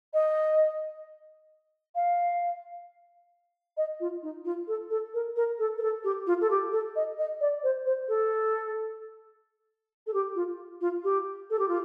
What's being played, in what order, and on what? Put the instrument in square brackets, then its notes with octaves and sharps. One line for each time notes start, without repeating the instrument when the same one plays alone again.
[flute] D#5
F5
D#5
F4
D#4
F4
A4
A4
A#4
A#4
A4
A#4
A4
G4
F4
A4
G4
A4
D#5
D#5
D5
C5
C5
A4
A4
G4
F4
F4
G4
A4
G4
F4